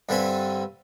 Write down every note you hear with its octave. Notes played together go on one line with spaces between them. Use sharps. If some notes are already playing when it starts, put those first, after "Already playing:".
G2 D3 G3 C4 G#5 B5